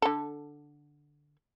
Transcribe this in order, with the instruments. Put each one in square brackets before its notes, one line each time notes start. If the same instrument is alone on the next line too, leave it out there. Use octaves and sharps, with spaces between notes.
[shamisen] D3 A4